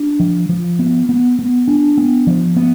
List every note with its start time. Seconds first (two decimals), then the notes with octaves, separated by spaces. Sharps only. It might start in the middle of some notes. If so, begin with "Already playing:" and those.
Already playing: D4
0.20 F3
0.49 F3
0.79 B3
1.09 B3
1.39 B3
1.68 D4
1.97 B3
2.27 F3
2.56 B3